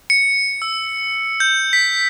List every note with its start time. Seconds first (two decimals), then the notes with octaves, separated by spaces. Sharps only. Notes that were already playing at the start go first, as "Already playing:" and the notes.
0.10 C#7
0.62 E6
1.40 G6
1.73 B6